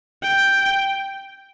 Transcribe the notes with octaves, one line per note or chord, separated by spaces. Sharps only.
G5